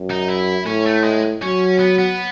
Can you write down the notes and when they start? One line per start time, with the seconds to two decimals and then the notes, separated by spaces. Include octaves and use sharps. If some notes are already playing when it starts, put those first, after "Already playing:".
Already playing: F#2
0.11 D#4
0.29 E4
0.66 A2 C#4
0.86 A3
1.04 G#3
1.42 F#3 C#4
1.79 B3
1.98 B3